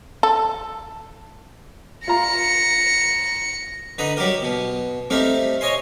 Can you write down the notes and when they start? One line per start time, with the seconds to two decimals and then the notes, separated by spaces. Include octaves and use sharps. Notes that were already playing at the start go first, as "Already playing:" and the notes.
0.23 A4
2.07 F4 A#5 A#6 C#7
3.98 D3 D#4 B4 A#5 D#6
4.17 F#3 G3 G4 A#4
4.42 B2
5.10 G3 A3 C4 D#4 F5
5.61 C#5 D#5 G#5 C6